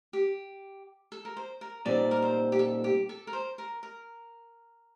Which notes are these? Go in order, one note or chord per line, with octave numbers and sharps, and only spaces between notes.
G4
A4
A#4
C5
A#4
A#2 G3 C4 D#4 D5
A#4
C5
G4
A4
G4
A4
A#4
C5
A#4
A#4